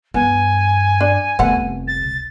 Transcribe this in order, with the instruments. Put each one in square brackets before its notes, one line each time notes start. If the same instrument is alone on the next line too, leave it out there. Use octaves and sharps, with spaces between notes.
[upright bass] G2 [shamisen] B3 [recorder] G#5
[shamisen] D4
[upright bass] F1 C2 [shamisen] A3 B3 F#5
[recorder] A6